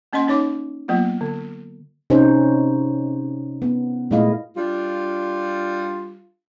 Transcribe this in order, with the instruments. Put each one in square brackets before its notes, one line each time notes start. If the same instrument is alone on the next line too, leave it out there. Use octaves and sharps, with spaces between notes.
[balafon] A#3 C#4 D#5 F#5 C6
C#4 D#4 C#5 D6
F#3 A#3 B3 F4
D3
[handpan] C3 C#4 D#4 C5
B3
A#2 G#3 A3 E4 D#5 F5
[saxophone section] G3 D4 F4